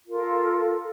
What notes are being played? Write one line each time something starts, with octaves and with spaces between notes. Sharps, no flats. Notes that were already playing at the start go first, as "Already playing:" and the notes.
F4 A4 A#4